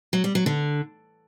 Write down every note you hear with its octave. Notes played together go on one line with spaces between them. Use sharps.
F#3
G3
F#3
D3